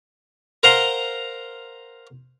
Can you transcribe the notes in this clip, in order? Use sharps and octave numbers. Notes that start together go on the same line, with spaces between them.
A#4 C5 F5 F#5 A#5 C6